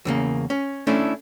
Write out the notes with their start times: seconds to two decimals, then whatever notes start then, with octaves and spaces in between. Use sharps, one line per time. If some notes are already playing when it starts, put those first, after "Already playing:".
0.05 E2 C#3 A#3
0.50 C#4
0.87 A3 C#4 D4 E4